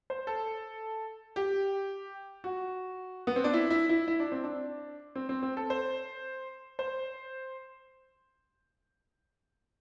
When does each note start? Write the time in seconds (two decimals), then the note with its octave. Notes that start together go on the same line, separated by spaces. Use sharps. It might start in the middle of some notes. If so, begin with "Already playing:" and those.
0.10 C5
0.27 A4
1.36 G4
2.44 F#4
3.27 B3
3.36 C4
3.44 D4
3.53 E4
3.70 E4
3.89 E4
4.08 E4
4.20 D4
4.32 C4
4.44 D4
5.15 C4
5.29 C4
5.42 C4
5.57 A4
5.70 C5
6.79 C5